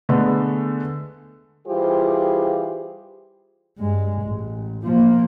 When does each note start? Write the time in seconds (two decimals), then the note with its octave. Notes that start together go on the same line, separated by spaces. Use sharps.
0.09 D3 G#3 A3 B3
1.67 E3 G3 F4 G4 G#4 C5
3.78 G2 G#3
4.22 A1
4.84 F3 A#3